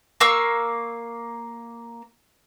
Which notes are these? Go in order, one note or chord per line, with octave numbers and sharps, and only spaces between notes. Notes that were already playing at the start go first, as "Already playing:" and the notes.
A#3 F5 C#6 E6